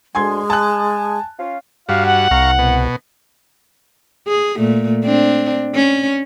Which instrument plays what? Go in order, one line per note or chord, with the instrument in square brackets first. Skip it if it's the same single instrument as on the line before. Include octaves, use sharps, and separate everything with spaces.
[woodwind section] D2 [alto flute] G#3 [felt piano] G#5 C6 G#6
[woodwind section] G#5 [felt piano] A5 F#6
[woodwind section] C#4 F4
[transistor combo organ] G2 F#4 [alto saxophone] F5
[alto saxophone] F#5
[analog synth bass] C2 [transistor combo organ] F5 A#5 C#6
[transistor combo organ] B2
[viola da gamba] G#4
A#2 A3
C4 D4
C#4